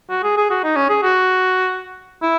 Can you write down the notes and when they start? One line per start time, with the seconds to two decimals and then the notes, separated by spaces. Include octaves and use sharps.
0.10 F#4
0.23 G#4
0.37 G#4
0.50 F#4
0.64 D#4
0.76 C#4
0.89 G#4
1.03 F#4
2.22 E4